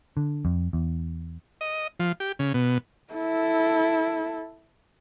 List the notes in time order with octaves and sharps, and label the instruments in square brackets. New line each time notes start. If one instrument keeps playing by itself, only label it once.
[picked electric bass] D3
F2
E2
[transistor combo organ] D#5
F3
G4
C#3
B2
[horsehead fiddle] E4 A4